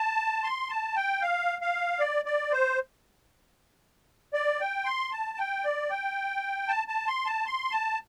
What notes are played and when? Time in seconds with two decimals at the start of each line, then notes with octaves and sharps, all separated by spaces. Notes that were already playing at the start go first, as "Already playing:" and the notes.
Already playing: A5
0.43 C6
0.70 A5
0.96 G5
1.22 F5
1.61 F5
1.99 D5
2.25 D5
2.52 C5
4.34 D5
4.60 G5
4.85 C6
5.12 A5
5.38 G5
5.64 D5
5.90 G5
6.68 A5
6.88 A5
7.07 C6
7.26 A5
7.46 C6
7.71 A5